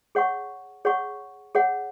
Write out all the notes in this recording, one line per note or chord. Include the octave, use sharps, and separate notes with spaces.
G#4 C#5 F#5 C#6
G#4 C#5 F#5 C#6
G#4 C#5 F#5